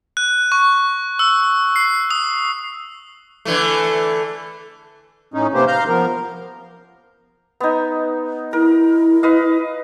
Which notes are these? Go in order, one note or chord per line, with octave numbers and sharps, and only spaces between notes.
F#6
C#6
E6
C7
D#6
D3 E3 A3
A2 C#4 D#4
C3 A#3 B3 G4 C5
F5 A#5 F6 G6
F3 B3 A#4
B3 D#4
E4 A#4
B4 D#5 F5